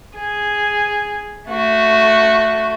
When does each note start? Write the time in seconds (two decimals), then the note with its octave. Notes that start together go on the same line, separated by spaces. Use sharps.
0.16 G#4
1.49 A3 F#4